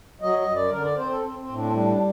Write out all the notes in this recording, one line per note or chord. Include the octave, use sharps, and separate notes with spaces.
F#3 D#5
D#5
F#2
D5
D3 A#4
D5
C4 C5
A4
C4
C4
A2
D4
C4
G3 D4
D4